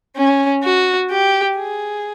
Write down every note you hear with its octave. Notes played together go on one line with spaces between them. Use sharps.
C#4
F#4
G4
G#4